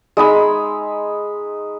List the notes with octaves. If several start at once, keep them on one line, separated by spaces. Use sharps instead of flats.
G#3 D#4 B5 E6